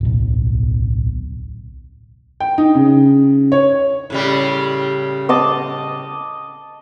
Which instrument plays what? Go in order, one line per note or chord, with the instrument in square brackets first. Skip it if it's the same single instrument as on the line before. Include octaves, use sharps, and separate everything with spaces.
[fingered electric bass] D1 B1
[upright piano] G5
D#4
C#3
C#5
[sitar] A2 C#3 G3
[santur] D#5 A5 D6